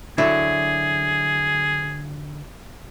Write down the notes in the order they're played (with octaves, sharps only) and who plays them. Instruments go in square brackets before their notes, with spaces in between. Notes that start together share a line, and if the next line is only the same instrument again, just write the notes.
[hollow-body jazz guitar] D3 F#3 E4 [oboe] G#4